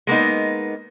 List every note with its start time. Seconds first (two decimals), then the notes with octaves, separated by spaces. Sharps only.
0.07 G#3 A#3 B3 D#4